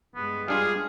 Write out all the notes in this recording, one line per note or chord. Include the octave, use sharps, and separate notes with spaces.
G2 G#3 B3
G3 D4 F4 G#4 F5